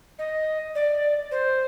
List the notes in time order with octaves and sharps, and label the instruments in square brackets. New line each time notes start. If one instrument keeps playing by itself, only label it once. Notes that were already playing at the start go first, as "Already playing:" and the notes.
[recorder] D#5
D5
C5